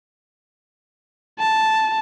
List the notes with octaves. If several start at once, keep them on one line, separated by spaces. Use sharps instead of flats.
A5